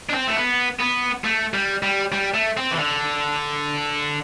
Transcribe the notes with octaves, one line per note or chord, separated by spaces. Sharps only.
D4
C4
A3
B3
B3
A3
G3
G3
G3
A3
C4
E3
D3